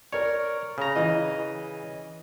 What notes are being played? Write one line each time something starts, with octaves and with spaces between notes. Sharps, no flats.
A#4 C#5 D5
C#3 A#5
E3 D#5